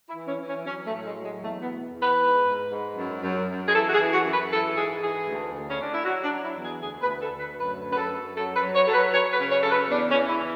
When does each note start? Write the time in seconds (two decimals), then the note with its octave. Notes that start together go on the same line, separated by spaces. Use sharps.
0.08 E4
0.15 E3
0.27 C#4
0.40 E3
0.47 C#4
0.65 F#3 C#4
0.85 A3
0.91 A2
1.04 G#3
1.18 F#3
1.23 G#3
1.42 E2 A3
1.61 B3
1.69 B2
1.94 E2
2.01 B4
2.19 G#2
2.46 G#2
2.72 G#2
2.97 F#2
3.23 F#2
3.48 F#2
3.68 G#4
3.74 E3 A4
3.88 F#4
3.93 G#4
3.99 E3
4.13 F#4
4.25 F#2
4.32 B4
4.50 E3 A4
4.76 G#2 G#4
5.01 E3 G#4
5.28 D2
5.53 D2
5.69 C#4
5.79 D3 D4
5.93 E4
6.04 F#3 F#4
6.24 D4
6.30 F#3
6.43 E4
6.57 E2
6.63 G#4
6.82 D2 G#4
7.01 B4
7.07 D2
7.20 A4
7.33 D2
7.39 B4
7.59 F#2 B4
7.84 F#2
7.92 B4
7.97 A4
8.10 F#2
8.36 F#3 A4
8.55 B4
8.61 F#3
8.74 C#5
8.86 F#3 A4
8.94 B4
9.13 F#3 C#5
9.32 B4
9.38 C#3
9.51 C#5
9.62 C#3 A4
9.71 B4
9.90 E2 D4
10.09 C#4
10.15 E3
10.28 E4